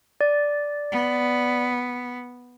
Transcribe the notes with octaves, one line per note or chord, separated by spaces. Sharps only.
D5
B3